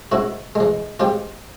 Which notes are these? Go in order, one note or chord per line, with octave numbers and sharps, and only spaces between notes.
G#2 E4 F#4
E3 G#3
G#2 F4 G4